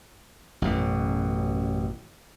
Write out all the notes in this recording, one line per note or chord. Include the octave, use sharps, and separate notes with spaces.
A1 F#2 B2